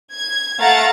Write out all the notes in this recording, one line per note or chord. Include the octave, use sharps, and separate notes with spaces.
G#6
A3 F5 F#5 A#5 A6